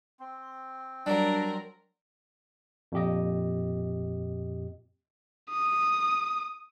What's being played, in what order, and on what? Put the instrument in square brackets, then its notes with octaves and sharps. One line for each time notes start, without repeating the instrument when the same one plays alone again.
[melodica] C4
[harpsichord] F#3 G3 [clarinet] D4 [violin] A#4
[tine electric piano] F2 A#2 G4 D#5
[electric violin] D#6